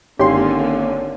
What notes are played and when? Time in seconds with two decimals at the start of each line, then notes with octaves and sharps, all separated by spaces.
0.19 G#1 D3 A#3 C#4 G4 C6